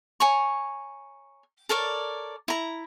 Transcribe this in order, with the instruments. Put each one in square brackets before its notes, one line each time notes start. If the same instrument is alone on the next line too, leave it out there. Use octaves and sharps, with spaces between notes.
[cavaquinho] C#5 G#5 A#5 C#6
A4 A#4 C#5 D5
E4 A#5